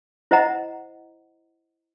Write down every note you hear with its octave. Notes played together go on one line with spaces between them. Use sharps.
E4 C5 D#5 F#5 A#5